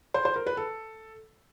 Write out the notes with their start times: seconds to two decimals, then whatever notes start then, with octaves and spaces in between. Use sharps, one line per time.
0.14 C5
0.25 C5
0.36 A#4
0.46 B4
0.57 A4